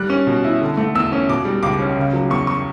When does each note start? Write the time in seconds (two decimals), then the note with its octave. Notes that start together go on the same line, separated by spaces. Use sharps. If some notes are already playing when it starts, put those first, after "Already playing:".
Already playing: G3 F#6
0.10 C#4
0.27 B2
0.44 E4
0.61 D3
0.77 A3
0.95 E2 E6
1.12 C#4
1.29 B2 D6
1.45 G3
1.63 C#2 D6
1.80 C#4
1.97 C#3
2.13 F#3
2.30 E2 C#6
2.47 C#6